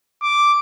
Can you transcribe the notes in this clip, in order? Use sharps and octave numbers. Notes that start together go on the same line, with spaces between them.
D6